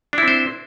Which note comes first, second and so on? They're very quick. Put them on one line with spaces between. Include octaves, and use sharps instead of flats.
D4 E4 C4 C5